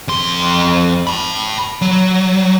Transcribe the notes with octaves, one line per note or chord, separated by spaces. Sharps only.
F2 C6
A5 B5
F#3